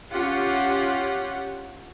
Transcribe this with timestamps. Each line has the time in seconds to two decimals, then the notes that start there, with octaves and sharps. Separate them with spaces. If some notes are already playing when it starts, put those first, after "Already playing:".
0.11 C#4 F4 G4 F#5